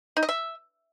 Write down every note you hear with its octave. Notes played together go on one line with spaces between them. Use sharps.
D#4
D#5
E5